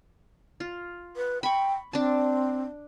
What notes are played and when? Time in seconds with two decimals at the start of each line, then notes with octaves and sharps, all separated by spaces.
0.60 F4
1.17 B4
1.43 G5 B5 C#6
1.93 C4 D4 A5